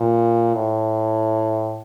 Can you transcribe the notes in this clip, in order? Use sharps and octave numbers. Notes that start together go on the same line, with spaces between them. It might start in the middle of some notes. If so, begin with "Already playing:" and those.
Already playing: A#2
A2